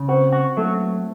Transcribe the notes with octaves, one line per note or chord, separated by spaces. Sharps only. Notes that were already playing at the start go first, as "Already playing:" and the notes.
Already playing: C#3
C4 F#4 C5
F#4
F#3 A3 A4